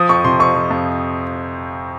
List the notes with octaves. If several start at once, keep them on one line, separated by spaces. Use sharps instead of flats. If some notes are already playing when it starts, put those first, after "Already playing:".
Already playing: F3 D#6
F2 C#6
C3 C6
F2 C#6
F3
F2